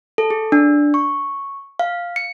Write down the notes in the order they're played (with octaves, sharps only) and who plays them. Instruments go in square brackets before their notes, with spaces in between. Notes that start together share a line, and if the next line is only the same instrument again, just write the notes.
[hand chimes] A4
G#4
D4
C#6
F5
C#7